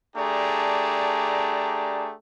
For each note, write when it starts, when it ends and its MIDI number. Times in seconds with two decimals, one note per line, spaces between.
0.15 2.14 57
0.15 2.14 62
0.15 2.14 67
0.15 2.14 68
0.15 2.14 74
0.15 2.14 82